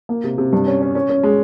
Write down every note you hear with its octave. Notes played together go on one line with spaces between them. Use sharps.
A#3
C3
C3
G2
C#4
C#4
C#4
C#4
G#3